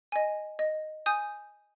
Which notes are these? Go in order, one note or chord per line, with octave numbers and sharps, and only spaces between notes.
D#5 G#5
D#5
G#5 D#6 G6